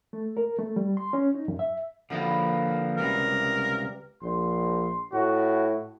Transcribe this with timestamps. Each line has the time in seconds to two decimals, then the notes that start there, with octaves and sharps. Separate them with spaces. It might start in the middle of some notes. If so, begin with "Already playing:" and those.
0.13 A3
0.37 A#4
0.59 A3
0.76 G3
0.97 C6
1.13 C#4
1.34 D#4
1.48 F#2
1.59 E5
2.10 D3 F3 A#3 B4 F5 F#5
2.97 C#2 C3 G3 A#4
4.23 A#1 C6
5.13 A2 F#4